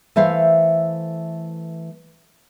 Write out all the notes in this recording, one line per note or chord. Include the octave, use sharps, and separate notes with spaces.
E3 A3 C5 E5 F5